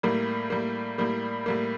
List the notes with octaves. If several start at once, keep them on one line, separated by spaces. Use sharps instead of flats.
A2 G3 A#3
A2 G3 A#3
A2 G3 A#3
A2 G3 A#3